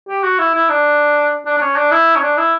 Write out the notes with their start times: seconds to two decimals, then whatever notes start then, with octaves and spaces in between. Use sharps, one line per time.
0.08 G4
0.23 F#4
0.39 E4
0.54 E4
0.69 D4
1.46 D4
1.57 D4
1.61 C#4
1.76 D4
1.91 E4
2.16 C#4
2.22 D4
2.37 E4